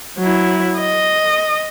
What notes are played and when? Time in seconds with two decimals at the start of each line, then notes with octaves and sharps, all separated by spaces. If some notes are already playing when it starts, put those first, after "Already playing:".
0.18 F#3 E4
0.80 D#5